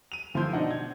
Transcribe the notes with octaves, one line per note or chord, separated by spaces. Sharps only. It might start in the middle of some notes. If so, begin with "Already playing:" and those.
D#7 F7
G1 F3 E4 C6 G6
B2 D4 D#4 F#5
G#6